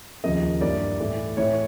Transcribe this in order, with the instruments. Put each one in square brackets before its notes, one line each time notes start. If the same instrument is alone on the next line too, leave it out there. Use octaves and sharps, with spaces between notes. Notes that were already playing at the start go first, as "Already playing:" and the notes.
[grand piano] D#2 C#3 F3 A#3 D#5
G2 E3 G3 A#3 D5
A2 E3 A3
A2 E3 A3 C#5